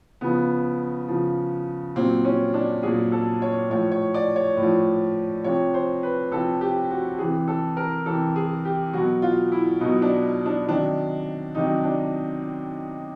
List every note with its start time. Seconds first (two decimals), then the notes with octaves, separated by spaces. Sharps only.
0.21 C#3 F3 B3
1.08 C#3 F3
1.96 A#2 F#3 C4
2.25 C#4
2.54 D4
2.83 A#2 F#3 G#4
3.12 A4
3.42 C#5
3.70 A2 F3 C#5
3.92 C#5
4.14 D5
4.36 C#5
4.57 A2
4.62 F3
5.44 C3 F3 C#5
5.74 C5
6.03 B4
6.31 C3 F3 A4
6.61 G4
6.91 F#4
7.19 C3 E3 G#4
7.48 A4
7.77 A#4
8.06 C3 E3 A4
8.36 G#4
8.65 G4
8.93 B2 F#3 F#4
9.22 F4
9.52 E4
9.80 B2 F#3 D#4
10.02 D4
10.46 D4
10.67 C3 D#3 F#3 D4
11.55 C3 D#3 F#3 D#4
11.84 D4